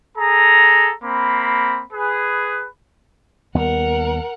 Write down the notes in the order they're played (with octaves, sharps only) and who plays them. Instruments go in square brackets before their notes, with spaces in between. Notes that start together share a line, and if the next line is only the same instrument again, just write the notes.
[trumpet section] G#4 A4 A#5
A#3 C4 B5
G#4 B4
[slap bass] D#2 G3 B3 [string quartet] A#4 F#5